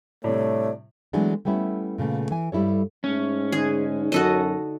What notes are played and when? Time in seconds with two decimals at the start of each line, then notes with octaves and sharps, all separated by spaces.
0.24 A2 C3 G3 A3 D4 C#5
1.13 E3 F#3 G#3 A3 B3 D4
1.45 G3 A3 B3 C#4 E4
1.98 A#2 C#3 A3 B3
2.31 E3 G#5
2.52 G2 G3 E4 A4 C#5
3.04 G#2 A3 C#4
3.52 D3 D#4 G#4 F#6
4.12 F#2 F#4 A4 D#5